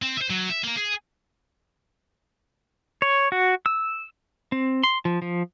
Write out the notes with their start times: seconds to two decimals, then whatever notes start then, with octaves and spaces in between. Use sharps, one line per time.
0.02 C4
0.17 C5 E5
0.30 F#3
0.50 E5
0.63 A#3 A#4
0.77 G#4
3.02 C#5
3.32 F#4
3.66 E6
4.52 C4
4.84 C6
5.05 F3
5.22 F3